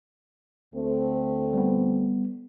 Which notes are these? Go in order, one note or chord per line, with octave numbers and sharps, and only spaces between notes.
D2 A3 C4
G3 B3